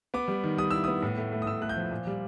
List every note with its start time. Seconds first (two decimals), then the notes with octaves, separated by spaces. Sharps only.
0.14 B3 D6
0.28 G3
0.44 D#3
0.57 G3 D#6
0.71 E4 E6
0.84 B3 D#6
1.02 A2
1.17 A3
1.32 A3
1.42 D#6
1.46 A2 E6
1.61 A3 F#6
1.69 G6
1.76 F3
1.91 A#2
2.07 G3